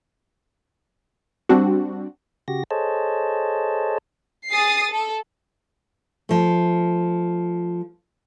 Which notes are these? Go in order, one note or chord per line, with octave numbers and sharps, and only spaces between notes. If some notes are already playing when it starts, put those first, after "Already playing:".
G3 C4 D4 F#4
C#3 F#4 G4 A#6
G#4 A4 C5 C#5 D#5 A5
G#4 D#6 A6 C7
A4
F3 A3